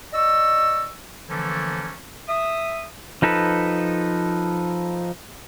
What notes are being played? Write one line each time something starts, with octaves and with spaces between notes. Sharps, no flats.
D5 D#5 C#6 E6
D3 E3 F3 A3 A#3 C#4
E5 D#6
F3 D#4 A4 B4